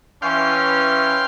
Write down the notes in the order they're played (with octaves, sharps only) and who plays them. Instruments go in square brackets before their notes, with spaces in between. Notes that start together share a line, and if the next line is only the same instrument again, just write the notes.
[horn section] E3 C#4 [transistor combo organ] F5 G5 C6